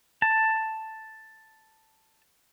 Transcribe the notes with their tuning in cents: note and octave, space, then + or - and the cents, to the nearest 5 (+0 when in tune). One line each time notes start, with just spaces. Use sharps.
A5 +5